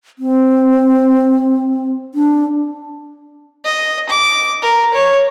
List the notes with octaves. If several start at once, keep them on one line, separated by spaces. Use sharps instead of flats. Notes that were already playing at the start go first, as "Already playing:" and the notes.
C4
D4
D#5
D6
A#4
C#5